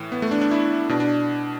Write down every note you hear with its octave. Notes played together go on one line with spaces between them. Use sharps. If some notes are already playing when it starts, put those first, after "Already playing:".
Already playing: A2 E3
B3
A3
D4
D4
E4
B2 D4
D4